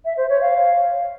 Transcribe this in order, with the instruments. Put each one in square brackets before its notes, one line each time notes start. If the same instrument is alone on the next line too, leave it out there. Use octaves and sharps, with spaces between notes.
[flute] E5
C5
C#5
F5